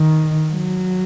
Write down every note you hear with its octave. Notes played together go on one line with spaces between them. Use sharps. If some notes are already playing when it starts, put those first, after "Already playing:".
Already playing: D#3
F#3